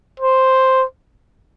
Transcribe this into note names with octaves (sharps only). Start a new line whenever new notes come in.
C5